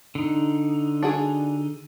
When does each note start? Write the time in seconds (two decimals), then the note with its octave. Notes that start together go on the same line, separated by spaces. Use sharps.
0.15 D3 D#4
1.03 D4 F#4 G#4